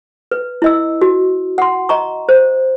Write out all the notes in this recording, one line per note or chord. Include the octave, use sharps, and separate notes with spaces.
B4
E4 D#5 E6
F#4
F#5 C6
D#5 A#5 C#6
C5